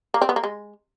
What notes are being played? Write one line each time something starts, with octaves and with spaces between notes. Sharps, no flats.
A#3
C4
B3
A#3
G#3